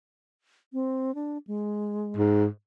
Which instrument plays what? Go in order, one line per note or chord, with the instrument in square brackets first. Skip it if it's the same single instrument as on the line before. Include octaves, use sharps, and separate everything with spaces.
[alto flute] C4
D4
G#3
[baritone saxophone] G#2